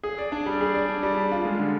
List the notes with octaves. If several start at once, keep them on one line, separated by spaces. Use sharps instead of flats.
G#4
D5
D4
G3
G#4
D5
D4
G3
D4
F4
G#3
D3